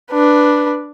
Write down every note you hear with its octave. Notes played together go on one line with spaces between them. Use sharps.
D4 B4